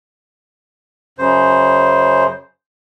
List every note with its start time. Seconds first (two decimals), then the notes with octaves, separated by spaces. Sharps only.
1.19 F#2 C#3 C5